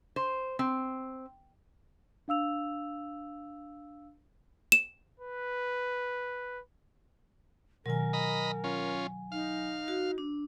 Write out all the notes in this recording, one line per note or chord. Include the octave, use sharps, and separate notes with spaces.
C5
C4
D4 F5 E6 F7
E7
B4
B2 D#3 F#3 A#4 G#5
D#5 A#5 B5
C#4 F4
D#4 F5
F#4
D4